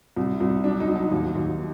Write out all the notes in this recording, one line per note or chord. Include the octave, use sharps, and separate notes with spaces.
C2
C2
F#3 D4
D#4
F#3
D#4
D#2
D#2